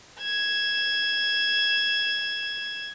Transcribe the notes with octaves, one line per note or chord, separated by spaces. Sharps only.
G#6 E7